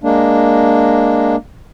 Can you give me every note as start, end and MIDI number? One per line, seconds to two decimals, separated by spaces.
0.03 1.36 56
0.03 1.36 58
0.03 1.36 62